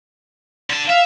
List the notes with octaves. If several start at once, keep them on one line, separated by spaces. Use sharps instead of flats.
D3 A5
E5 F5